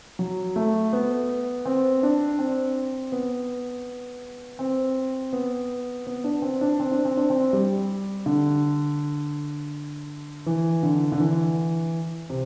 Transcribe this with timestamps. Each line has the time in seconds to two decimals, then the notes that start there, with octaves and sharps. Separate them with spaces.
0.19 F#3
0.56 A3
0.93 B3
1.65 C4
2.03 D4
2.39 C4
3.12 B3
4.59 C4
5.33 B3
6.07 B3
6.24 D4
6.42 C4
6.61 D4
6.80 C4
6.92 D4
7.05 C4
7.17 D4
7.30 C4
7.53 G3
8.26 D3
10.46 E3
10.83 D3
11.12 D3
11.20 E3
12.30 C3